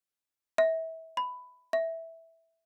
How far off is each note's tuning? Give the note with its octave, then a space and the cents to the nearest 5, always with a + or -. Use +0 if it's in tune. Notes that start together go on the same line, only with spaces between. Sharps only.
E5 -25
B5 +15
E5 -5